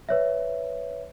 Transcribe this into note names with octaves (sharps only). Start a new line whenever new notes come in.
B4 C#5 E5